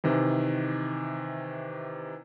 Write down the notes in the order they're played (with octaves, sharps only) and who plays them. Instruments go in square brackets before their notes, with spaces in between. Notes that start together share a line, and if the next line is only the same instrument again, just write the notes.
[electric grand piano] C3 D#3 E3